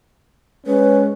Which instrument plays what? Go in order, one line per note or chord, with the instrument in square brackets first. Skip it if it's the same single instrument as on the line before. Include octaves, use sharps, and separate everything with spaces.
[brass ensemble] G#3 C#4 [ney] B4